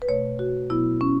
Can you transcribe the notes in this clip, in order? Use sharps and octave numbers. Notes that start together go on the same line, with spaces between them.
B4
B2 A3 C#5
F#4
B2 F#3 B3 E4
C#4